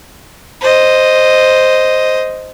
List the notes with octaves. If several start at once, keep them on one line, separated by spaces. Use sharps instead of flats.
C5 D#5